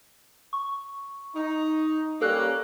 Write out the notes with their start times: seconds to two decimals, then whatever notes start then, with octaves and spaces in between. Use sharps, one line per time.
0.53 C#6
1.36 D#4
2.22 G3 A#3 C#4 A4 F#6